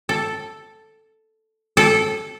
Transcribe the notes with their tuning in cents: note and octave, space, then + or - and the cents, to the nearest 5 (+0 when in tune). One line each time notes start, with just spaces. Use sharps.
A4 +0
A4 -15